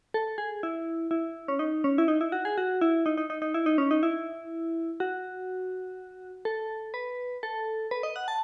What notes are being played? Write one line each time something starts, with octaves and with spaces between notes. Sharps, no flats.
A4
G#4
E4
E4
C#4
D#4
C#4
E4
D#4
E4
F#4
G#4
F#4
E4
D#4
D#4
D#4
D#4
E4
D#4
C#4
D#4
E4
F#4
A4
B4
A4
B4
D#5
F#5
A5